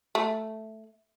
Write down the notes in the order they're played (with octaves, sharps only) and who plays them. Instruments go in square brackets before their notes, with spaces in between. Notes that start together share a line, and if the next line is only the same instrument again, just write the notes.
[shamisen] A3